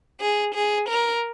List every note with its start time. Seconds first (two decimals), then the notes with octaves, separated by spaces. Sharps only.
0.20 G#4
0.54 G#4
0.88 A#4